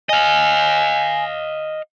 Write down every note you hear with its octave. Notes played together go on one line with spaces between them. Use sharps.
D#5 F5 G#5